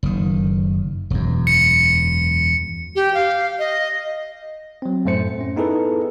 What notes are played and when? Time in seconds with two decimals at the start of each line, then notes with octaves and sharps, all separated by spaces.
0.03 F#1 D#3
1.10 E1 F#2
1.47 C#7
2.96 G4
3.14 F5
3.59 D#5
4.82 F#3 C4
5.05 F#2 A2 A3 C5 C#7
5.41 C#4
5.56 B3 D#4 E4 G#4 A4 B4